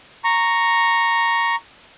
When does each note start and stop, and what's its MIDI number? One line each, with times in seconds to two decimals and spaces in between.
0.24 1.55 82
0.24 1.55 85